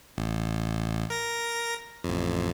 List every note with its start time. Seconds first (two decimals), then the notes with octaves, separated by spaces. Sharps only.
0.18 A1
1.10 A#4 A#6
2.04 A1 F2